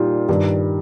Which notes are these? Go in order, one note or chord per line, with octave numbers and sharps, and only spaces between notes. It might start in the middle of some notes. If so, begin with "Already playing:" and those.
Already playing: A#2 G3 D#4 F4 G4
G2 D#3 G3